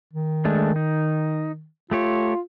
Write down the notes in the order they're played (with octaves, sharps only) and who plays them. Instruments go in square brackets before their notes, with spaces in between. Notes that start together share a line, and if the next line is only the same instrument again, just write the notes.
[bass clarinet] D#3
[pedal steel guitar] G#3 A3 D4
D#4
[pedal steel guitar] A3 G4 C#5 [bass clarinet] F4